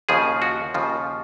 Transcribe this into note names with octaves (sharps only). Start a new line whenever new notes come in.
D#2 C#3 F3 G#4
F#4
D#2 C#3 F3 F4